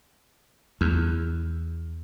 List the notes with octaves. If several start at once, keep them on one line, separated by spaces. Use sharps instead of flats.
E2